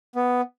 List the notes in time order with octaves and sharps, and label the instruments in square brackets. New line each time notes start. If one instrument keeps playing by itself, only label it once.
[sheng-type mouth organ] B3